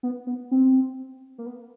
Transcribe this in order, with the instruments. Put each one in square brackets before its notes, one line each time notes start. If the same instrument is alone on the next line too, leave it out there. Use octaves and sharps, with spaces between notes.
[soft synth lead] B3
B3
C4
A#3
B3